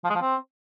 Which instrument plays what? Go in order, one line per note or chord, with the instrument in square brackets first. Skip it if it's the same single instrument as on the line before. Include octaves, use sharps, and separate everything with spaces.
[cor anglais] F3
G#3
F3
C4